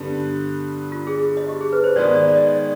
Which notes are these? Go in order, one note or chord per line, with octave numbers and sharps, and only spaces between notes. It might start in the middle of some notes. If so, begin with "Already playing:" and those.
Already playing: G2 D3 G3 B3
F4
G#4
D#5
G4
G#4
B4
C5
G#2 D#3 G#3 B3 D5
D5
D5
D#5
D5